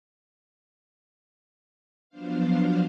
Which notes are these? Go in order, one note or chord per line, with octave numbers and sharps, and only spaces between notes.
F3 F#3 B3 D4 C5 F5